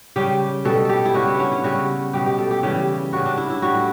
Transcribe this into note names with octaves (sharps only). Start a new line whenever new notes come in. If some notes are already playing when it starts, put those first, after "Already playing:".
C#3 G3 G4
B2 G3 A4
G4 A4
E4
C#3 G3 F#4
B3
C#4 D4
E4
C#3 G3 F#4
B2 G3 G4
G4
A4
G4
C#3 E3 G3 G4
C#3 G3 F#4
D4
E4
E4
A2 G3 F#4